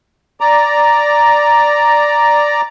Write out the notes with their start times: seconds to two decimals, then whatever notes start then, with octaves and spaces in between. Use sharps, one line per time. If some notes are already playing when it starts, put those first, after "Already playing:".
0.40 D5 A#5